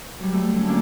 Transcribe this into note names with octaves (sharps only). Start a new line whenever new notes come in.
F#3 G3
A3
D3 C#4
A3 A#3 C#4 D4 F#4 D5